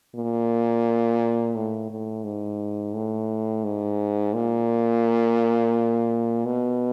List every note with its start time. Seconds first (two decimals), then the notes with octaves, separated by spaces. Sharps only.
0.15 A#2
1.55 A2
1.90 A2
2.24 G#2
2.95 A2
3.64 G#2
4.34 A#2
6.45 B2